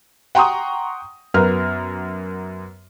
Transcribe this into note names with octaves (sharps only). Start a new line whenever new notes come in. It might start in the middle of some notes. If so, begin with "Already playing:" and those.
F#5 G5 A#5 C6 C#6 D#6
F#2 B3 A#4 F6